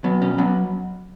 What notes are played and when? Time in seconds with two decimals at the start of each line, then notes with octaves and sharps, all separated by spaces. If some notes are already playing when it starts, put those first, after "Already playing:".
0.04 F#3 B3
0.22 B2 C#4
0.38 F#3 B3